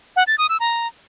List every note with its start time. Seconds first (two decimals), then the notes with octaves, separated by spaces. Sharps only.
0.16 F#5
0.27 A6
0.38 D#6
0.49 E6
0.60 A#5